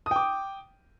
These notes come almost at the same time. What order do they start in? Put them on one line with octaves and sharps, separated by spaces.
D#6 G5 D6